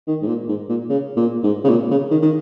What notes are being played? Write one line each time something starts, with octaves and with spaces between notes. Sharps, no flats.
D#3
G#2
A#2
G#2
A#2
C#3
A#2
G#2
C#3
A#2
C#3
D#3
D#3